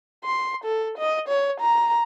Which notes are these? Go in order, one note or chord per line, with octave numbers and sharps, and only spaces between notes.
C6
A4
D#5
C#5
A#5